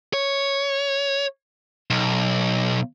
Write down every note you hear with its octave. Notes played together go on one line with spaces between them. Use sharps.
C#5
B1